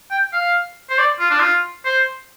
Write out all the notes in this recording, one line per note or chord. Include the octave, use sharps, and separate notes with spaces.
G5
F5
C5
D5
F4
D4
F4
C5